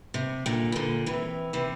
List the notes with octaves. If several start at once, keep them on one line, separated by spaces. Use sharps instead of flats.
C3
A#2 D3
E3
A#2 D3
C3 E3
C3 E3